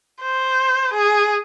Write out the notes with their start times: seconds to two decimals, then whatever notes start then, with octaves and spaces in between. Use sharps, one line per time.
0.21 C5
0.93 G#4